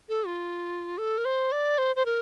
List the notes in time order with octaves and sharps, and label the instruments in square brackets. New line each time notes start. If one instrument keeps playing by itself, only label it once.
[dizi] A4
F4
A4
A#4
C5
D5
C5
C5
A#4